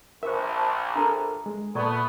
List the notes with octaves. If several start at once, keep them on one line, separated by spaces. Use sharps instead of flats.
A#1 A#4 C5 E5 C#6
A5
D4 A4 A#4 E5 A#5
G#3
A#2 A3 B3 A4 D5 C#6